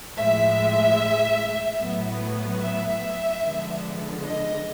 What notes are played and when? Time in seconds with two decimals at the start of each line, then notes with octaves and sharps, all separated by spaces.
0.18 A2 F3 G#3 E5
1.80 A2 F#3 B3
2.62 E5
3.43 D3 F3 G#3 B3
4.25 D#5